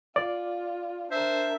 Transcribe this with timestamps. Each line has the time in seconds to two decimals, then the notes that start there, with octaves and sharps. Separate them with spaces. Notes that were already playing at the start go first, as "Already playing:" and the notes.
0.16 F4 D5
1.11 D4 A#4 C5 E5